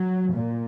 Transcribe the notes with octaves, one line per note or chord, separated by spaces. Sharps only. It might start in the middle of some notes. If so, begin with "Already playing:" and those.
Already playing: F#3
A#2